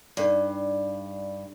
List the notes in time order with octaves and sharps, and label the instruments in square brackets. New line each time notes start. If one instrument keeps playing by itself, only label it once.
[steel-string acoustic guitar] G2 [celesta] D#4 A4 D5